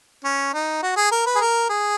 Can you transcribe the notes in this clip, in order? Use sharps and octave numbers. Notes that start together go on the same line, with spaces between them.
C#4
D#4
F#4
G#4
A#4
B4
G#4
A#4
G#4